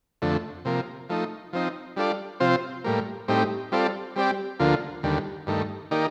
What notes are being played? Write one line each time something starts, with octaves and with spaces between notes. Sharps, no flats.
F2 D3 A3
C3 F3 A#3
F3 A3 D#4
F3 C4 D#4
G3 D4 F4 A4 D5
C3 F3 C4 F4 C5
A2 G3 A#3
A2 G3 C4 D#4 G4
G3 C4 F4 A4 D5
G3 C4 G4 D5
D2 D3 F3 A#3 F4
D#2 D3 G3
G2 D#3 A3
D#3 A#3 D#4 G4 D5